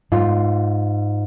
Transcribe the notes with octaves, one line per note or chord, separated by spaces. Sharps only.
G#2 F4